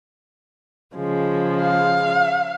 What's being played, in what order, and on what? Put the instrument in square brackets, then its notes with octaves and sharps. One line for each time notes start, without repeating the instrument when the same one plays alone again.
[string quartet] C#3 F3 G#3
[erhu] F5